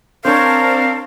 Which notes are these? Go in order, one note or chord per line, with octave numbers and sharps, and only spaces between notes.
C4 D4 A#4 C5 C#5 F5 A5